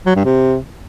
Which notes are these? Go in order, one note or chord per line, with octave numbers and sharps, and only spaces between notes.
F#3
G2
C3